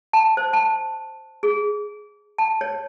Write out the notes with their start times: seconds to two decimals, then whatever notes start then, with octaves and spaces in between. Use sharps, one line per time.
0.13 A5
0.37 C5
0.53 A5
1.43 G#4
2.38 A5
2.61 C#5